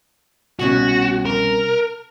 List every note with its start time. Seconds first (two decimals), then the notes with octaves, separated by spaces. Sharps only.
0.60 C2 B2 C#4 F#4
1.26 A#4